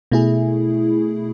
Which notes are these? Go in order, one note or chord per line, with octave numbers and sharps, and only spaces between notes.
B2 A3 E4 G#4